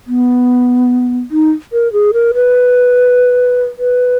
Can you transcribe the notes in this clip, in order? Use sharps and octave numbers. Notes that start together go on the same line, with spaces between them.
B3
D#4
A#4
G#4
A#4
B4
B4